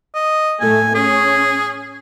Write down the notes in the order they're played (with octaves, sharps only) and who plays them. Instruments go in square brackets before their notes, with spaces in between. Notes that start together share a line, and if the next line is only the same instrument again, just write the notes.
[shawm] D#5
[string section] A2 A3 [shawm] G#5
[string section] C#4 [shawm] G#4